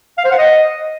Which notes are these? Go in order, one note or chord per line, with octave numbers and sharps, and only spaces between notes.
F5
C5
F#5
D#5